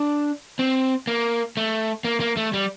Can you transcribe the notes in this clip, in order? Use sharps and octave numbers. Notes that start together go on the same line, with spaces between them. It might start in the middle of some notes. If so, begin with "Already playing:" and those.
Already playing: D4
C4
A#3
A3
A#3
A#3
A3
G3